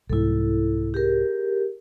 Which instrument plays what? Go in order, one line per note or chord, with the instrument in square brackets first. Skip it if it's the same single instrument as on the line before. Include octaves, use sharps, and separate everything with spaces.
[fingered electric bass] C2 G#2 [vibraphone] E4 A4
[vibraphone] G4 G#4 A#4